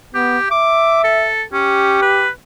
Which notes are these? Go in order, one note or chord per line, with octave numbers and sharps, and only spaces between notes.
B3 G4
E5 D6
A4
C#4 G4
B4